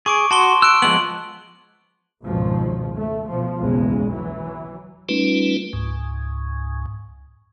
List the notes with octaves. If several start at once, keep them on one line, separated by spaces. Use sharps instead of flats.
G#4 C#6 D6 D7
F#4 A5 C6 G7
E6 F#6 D7
F3 G#3 B3 F#7
G#1 C#2 F#2 B2 D#3 F3
A3
B2 F3
F#1 B1 E2 C#3 G#3
E3 F#3
G3 A3 C#4 D#4 F4 B4
C#2 G#2